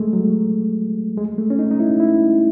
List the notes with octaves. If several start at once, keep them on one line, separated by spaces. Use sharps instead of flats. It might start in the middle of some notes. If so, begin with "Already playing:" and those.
Already playing: G#3 A3
F#3
G#3
A3
C#4
D#4
D#4
E4
E4